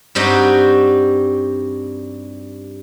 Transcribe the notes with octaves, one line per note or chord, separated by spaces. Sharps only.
G2 G3 C4 D#4 F#4